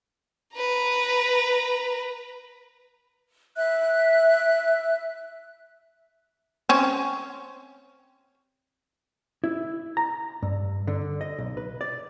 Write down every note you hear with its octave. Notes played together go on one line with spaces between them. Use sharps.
B4 A#5
E5 F#6
C4 C#4
E4
A#5
G2
D3
D#5
B1
B4
D5